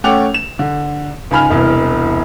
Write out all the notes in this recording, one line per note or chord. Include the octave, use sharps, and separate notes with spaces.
A3 C#4 F#5 G5 D6 F7
E7
D3
C#2 G#2 G#5 B5 F6 F7
E1 C2 E3